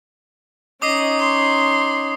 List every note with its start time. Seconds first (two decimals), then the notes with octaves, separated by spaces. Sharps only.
0.82 C#4 D#4 D#5 D6 D#6 C7
1.19 C6